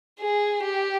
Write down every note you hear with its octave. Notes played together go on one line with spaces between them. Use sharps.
G#4
G4